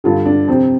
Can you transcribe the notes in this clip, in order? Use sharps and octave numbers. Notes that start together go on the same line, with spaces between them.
G2 D3 F4
D4
F2 C3 C4